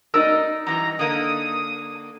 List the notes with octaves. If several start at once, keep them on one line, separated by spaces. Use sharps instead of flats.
D#4 A#4 D5 D#5 E6
F#2 E3 G3 A#5
D3 A#3 D#6